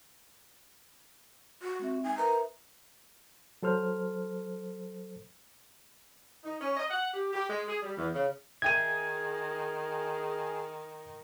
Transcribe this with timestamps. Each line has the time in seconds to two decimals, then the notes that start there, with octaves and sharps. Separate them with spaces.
1.62 F#4
1.79 G#3 C4 E5
2.04 D#4 G#5
2.17 A#4 B4 E5 A#5
3.63 F#3 A4 C5 F6
6.43 D#4
6.60 C#4
6.76 D#5
6.89 F#5
7.14 G4
7.33 G4
7.48 G#3
7.67 G#4
7.82 G3
7.96 E2
8.13 C#3
8.62 D#3 G#4 E5 G5 G#6 D#7